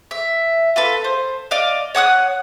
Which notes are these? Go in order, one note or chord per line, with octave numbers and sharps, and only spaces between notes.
E5
F4 A4 B4
C5
D5 D#5 F5
C#5 F#5 D#6 F#6